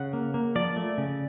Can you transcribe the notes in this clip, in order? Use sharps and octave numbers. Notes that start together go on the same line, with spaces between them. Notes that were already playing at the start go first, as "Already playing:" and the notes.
Already playing: C#3 F#5
A#3
A#3
F3 D5
A3
C#3